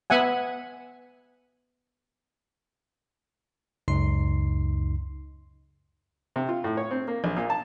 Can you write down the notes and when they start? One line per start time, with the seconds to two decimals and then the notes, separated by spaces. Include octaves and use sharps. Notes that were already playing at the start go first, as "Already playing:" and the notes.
0.10 B3 E5 F#5 G#5
3.88 C#2 F#2 C#3 D#4 C6 C7
6.36 C3
6.49 F4
6.64 A2
6.77 C#5
6.91 C4
7.08 A#3
7.24 A#1
7.37 A#2
7.50 A5